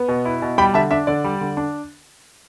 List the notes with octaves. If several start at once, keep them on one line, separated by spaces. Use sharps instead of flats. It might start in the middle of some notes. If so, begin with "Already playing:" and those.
Already playing: B3
B2
E4
B2
G3 G5 B5
D3 E5 A5
D4 E5
D3 D5
G3
D3
D4